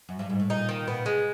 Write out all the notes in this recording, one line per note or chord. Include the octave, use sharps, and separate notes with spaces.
F#2
G2
G#2
A2
A#2 D#4
D#3
A#2 B3
G#3